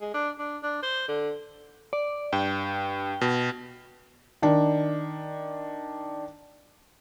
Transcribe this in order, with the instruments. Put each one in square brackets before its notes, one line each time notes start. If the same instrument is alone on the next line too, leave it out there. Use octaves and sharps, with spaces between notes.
[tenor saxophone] G#3
D4
D4
D4
C5
D3
[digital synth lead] D5
[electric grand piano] G2 [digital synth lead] G5
[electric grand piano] B2
[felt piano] D#3 D4